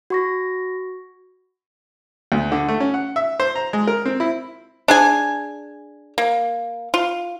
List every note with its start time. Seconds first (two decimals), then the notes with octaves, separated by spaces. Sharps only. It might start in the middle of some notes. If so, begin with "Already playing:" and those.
0.10 F#4 C#6 A#6
2.32 D2
2.52 D3
2.69 A3
2.80 C#4
2.94 F#5
3.16 E5
3.40 C5
3.55 A#5
3.73 G#3
3.87 A#4
4.05 C4
4.20 E4
4.88 D4 G#4 G#5
6.18 A#3
6.94 F4